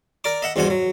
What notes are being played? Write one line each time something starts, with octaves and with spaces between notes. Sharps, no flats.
A#4 D5 D6
D#5 E5 F#5
E2 G2 B2 C4 F#5 G#5
F#3